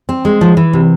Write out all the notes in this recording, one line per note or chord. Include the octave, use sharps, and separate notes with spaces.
C4
G#3
F3
E3
C3